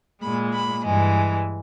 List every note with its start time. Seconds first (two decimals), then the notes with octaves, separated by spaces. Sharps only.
0.22 A#2 G#3 B5
0.53 B5
0.85 G2 E3 G#3